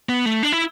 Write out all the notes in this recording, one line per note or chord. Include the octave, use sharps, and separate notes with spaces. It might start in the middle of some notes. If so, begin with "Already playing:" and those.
B3
A3
D4
E4